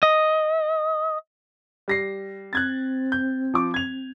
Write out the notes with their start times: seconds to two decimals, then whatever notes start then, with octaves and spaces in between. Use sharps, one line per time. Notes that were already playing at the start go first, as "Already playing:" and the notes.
0.03 D#5
1.88 G3 A#6 C7
2.53 C4 F#6 G#6 A6
3.12 G6
3.54 F3 D6
3.74 G#6 F7